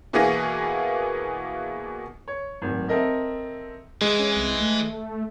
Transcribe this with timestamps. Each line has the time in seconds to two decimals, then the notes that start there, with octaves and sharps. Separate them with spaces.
0.13 B2 E3 A#3 B3 G#4 A#6
2.28 C#5
2.62 D1 G#1
2.88 C4 A4 A#4 D#5 E5
4.01 E3 G#3
4.19 C#4
4.36 C2
4.60 A3